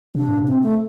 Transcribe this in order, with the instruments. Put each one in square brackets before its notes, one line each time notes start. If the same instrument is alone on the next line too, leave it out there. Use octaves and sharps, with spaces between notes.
[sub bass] C3 [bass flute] D4
[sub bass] A2
C3
[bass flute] C4
A3